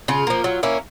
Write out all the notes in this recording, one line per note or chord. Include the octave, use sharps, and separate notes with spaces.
C#3 F4
F3 A#3
F#3
A#3 C#4 E4